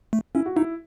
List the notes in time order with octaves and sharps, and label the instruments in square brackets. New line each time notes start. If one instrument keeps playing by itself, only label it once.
[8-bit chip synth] A3
[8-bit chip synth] C#4 [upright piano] E4
[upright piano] F#4
[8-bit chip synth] D#4 [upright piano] E4